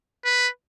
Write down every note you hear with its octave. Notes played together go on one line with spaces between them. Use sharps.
B4